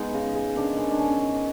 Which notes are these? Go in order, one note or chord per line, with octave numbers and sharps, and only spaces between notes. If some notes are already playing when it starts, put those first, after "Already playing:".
Already playing: G#3 B3 D#4
C#3
G#3
D#3 D4
D#3 C#4
D4
D#3 C#4